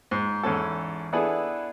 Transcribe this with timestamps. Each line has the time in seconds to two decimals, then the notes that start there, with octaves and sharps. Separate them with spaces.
0.11 G#2
0.43 E2 G#2 C#4 A4
1.13 B3 D4 E4 G#4 A4 B4